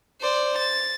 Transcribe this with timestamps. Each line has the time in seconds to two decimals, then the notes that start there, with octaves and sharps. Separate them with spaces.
0.21 C5 D5
0.58 A6